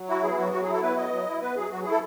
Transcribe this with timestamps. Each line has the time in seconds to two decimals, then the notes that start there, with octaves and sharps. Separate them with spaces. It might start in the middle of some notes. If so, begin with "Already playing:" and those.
Already playing: F#3
0.08 E4 F#4
0.23 B3 G#4
0.38 F#3 F#4
0.52 F#3 F#4
0.62 G#4
0.68 E4 A4
0.82 B3 B4
0.97 F#3 D#5
1.12 F#3
1.27 E4
1.41 B3 B4
1.56 F#3 G#4
1.71 F#3 F#4
1.81 G#4
1.86 E4 A4